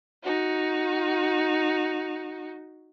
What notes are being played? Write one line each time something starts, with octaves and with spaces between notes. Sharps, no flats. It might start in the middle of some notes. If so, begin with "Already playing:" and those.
D#4 F#4